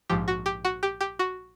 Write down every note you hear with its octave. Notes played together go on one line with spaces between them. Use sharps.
A#1 G#2 F3 G4
F#4
G4
F#4
G4
G4
F#4